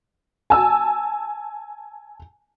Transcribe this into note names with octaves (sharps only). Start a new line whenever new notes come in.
G#5 A5 E6